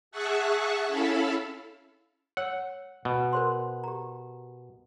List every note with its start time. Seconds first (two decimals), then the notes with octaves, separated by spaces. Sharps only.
0.11 G#4 E5 F#5 A5 C#6 F#6
0.87 C#4 E4 A4 F5 A5 B5
2.37 C#5 F#5 E6
3.05 B2
3.33 A#4 C5 C6
3.84 G4 A#5